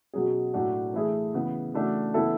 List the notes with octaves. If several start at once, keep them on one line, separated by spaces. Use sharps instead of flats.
B2 F#3 C#4 G#4
A2 F#3 A3 D4 F#4
E3 A3 E4 G#4
C#3 E3 B3
C#3 E3 A3 D4 F#4
C#3 E3 B3 E4 A4